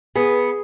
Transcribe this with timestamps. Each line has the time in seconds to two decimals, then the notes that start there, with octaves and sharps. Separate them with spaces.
0.15 B3 G#4